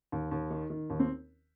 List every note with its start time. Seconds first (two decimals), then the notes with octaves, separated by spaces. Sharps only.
0.12 D#2
0.31 D#2
0.51 D#3
0.70 D#3
0.90 D#2
0.99 C4